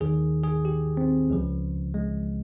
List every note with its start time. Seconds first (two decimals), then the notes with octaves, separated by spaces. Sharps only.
0.01 D#2 D#3 G#4
0.44 G#4
0.65 G4
0.97 C4
1.30 C#2 C#3 F3
1.94 G#3